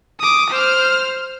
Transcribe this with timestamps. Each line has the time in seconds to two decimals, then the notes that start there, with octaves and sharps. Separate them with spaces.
0.20 D6 D#6
0.50 C5 F6